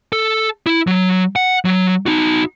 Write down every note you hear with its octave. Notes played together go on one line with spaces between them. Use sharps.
A4
E4
F#3
F#5
F#3
D#4 F#4